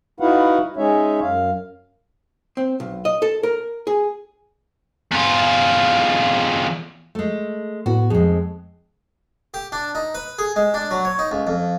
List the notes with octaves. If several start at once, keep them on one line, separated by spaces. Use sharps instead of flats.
D#4 E4 F#4 B4 F5 F#5
G#3 C#4 D#4 C#5 E5
F#2 F5
C4
B1
D#5
A4
A#4
G#4
E2 F4
G#3 A3
A2 B3 F#4
F2 G#3 G#4
G4
D4
D#4
B4
G#4
G#3
D4
F#3
C#5
D#4
C#2
F2